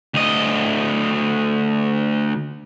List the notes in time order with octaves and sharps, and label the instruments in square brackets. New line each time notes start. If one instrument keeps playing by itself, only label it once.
[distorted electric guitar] D2 D#5